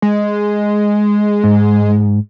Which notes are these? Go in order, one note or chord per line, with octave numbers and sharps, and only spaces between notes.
G#3
G#2